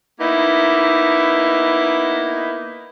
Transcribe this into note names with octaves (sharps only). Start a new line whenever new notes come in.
A#3 B3 D#4 E4